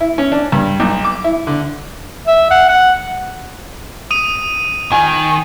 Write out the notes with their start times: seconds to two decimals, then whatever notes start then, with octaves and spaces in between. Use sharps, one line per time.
0.01 E4
0.18 C#4
0.32 D4
0.52 G2
0.80 B1
1.04 D6
1.24 E4
1.47 D3
2.27 E5
2.51 F#5
2.69 F#5
4.11 D#6 D#7
4.92 D#3 G#5